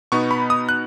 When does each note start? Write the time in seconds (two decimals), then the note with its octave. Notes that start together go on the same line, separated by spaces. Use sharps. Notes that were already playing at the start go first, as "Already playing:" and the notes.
0.12 B2 B3 D#4 C#6
0.31 B5
0.50 D#6
0.69 F#6